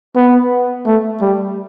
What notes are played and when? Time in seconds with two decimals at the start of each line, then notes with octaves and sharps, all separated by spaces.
0.15 B3
0.86 A3
1.21 G3